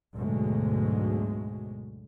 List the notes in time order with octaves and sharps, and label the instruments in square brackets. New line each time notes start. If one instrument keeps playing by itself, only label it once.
[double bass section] D2 G#2 B2 F#3 G#3